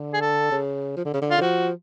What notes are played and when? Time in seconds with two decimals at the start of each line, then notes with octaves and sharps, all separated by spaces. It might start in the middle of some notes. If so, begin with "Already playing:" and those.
Already playing: D3
0.14 G#4
0.21 A4
0.51 C#3
0.97 F3
1.05 D3
1.14 C#3
1.22 D3
1.31 F4
1.38 D3
1.41 F3 F#4